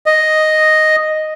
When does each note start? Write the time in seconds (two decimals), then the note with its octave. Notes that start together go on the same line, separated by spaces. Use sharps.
0.06 D#5